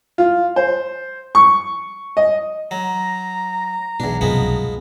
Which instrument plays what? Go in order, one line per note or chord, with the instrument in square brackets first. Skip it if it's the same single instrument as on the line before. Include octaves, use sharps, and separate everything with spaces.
[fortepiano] F4
C5
C#6
D#5
[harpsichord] F#3 [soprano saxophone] A#5
[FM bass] B1 [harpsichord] E2 D4
[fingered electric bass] C2 F#2 B2 [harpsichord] F3 G#3 B3